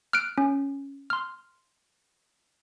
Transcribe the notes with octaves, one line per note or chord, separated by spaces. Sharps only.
F6 F#6 D7
C#4
C6 F6